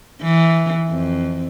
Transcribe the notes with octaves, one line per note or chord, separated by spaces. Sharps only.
E3
F2